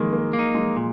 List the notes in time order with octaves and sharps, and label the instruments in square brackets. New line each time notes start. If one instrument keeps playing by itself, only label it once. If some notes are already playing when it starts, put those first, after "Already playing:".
Already playing: [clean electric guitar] D#3 [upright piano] G#3 A#3
[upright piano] A#3
[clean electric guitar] A#3
D#4
[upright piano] G#3
[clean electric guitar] A#2